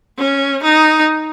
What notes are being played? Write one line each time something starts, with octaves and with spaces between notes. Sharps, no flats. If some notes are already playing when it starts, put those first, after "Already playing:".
C#4
D#4